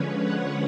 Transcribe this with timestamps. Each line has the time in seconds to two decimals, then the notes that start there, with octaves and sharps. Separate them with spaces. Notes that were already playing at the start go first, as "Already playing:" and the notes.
Already playing: D3 F3 G#3 C#4 B4 C#5
0.23 F#5